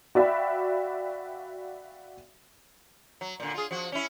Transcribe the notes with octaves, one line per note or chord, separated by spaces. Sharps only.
F#4 D5 E5 F5 G5 B5
F#3
A#2 D3
F4 G#4
F3 F#4
C#4 E4